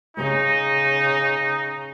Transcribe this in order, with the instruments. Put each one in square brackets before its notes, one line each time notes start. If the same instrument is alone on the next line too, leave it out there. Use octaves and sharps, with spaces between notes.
[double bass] C#3 [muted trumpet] D#4